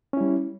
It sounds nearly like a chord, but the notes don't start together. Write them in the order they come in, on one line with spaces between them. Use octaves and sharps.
C#4 E4 G3